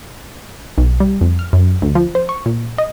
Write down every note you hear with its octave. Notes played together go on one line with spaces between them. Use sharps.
B1
G3
F2
F6
F#2
D2
F3
C5
C#6
A#2
D#5